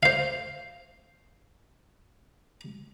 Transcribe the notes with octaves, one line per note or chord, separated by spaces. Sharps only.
C5 F5